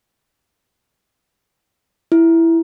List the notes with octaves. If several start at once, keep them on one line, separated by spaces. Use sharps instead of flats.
E4